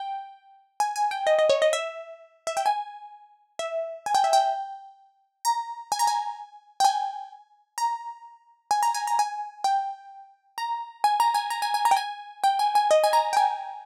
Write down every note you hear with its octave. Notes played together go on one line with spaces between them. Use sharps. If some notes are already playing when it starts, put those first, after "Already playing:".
Already playing: G5
G#5
G#5
G5
D#5
D#5
C#5
D#5
E5
E5
G5
G#5
E5
G#5
G5
E5
G5
A#5
G#5
A#5
G#5
G5
G#5
A#5
G#5
A#5
G#5
A#5
G#5
G5
A#5
G#5
A#5
G#5
A#5
G#5
G#5
A#5
G5
G#5
G5
G#5
G#5
D#5
G#5
A#5
G5
G#5